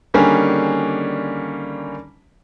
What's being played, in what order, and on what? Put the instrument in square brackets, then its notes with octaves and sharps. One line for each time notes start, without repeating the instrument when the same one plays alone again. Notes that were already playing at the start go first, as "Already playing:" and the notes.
[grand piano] D3 D#3 G3 A#3 C#4 G#4